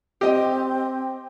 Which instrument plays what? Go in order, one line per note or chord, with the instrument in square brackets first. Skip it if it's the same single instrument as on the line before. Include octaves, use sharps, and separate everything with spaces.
[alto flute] C4 [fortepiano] G4 D#5